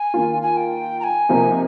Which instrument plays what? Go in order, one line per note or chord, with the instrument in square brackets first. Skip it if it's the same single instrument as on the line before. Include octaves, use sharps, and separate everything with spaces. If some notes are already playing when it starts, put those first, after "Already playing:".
Already playing: [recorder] G#5
[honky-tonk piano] D#3 A#3 F4
[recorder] G#5
G5
A#5
G#5
[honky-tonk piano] C3 F3 A#3 D#4